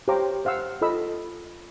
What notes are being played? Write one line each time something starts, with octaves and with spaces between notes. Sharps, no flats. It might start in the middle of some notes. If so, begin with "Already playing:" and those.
G4 C5 C#5 F5 A#5 D6
C5 F5 F#5 E6
F4 A4 D#5 B5 E6